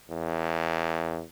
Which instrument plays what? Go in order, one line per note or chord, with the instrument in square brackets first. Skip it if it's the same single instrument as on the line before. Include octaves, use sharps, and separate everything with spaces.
[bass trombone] E2